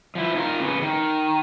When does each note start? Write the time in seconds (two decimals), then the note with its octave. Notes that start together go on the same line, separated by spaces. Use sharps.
0.15 F3 E4
0.35 D#4 F4 A4 A#4
0.59 C#3 B3
0.82 D#3